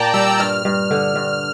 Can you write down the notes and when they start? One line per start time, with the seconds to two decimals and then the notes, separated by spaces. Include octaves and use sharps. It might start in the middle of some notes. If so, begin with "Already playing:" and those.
Already playing: A#2 D5 G5 A5 A#5
0.14 G3 E6
0.26 E6
0.40 G2 F6
0.65 G2
0.91 D3
1.16 G2